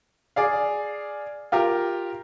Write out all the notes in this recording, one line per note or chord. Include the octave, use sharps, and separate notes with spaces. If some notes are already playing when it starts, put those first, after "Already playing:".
G#4 D5 F5
F4 G4 A#4